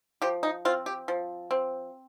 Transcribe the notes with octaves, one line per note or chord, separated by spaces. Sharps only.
F3 G4
D#4
C4 F4
G4
F3
C4